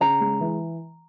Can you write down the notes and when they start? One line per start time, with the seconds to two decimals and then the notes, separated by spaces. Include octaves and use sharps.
0.01 C#3 A#5
0.21 G#3
0.40 E3